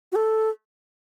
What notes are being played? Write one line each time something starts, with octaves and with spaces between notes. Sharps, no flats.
F#4
A4